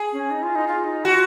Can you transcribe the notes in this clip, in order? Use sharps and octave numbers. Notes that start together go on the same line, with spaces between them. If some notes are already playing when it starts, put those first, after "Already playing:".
Already playing: G#4
C#4
D#4
F4
D#4
F4
F4
D#4
F4 F#4